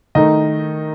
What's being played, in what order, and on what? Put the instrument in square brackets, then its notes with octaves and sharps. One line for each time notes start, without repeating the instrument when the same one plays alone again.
[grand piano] D#3 A3 D#4 D#5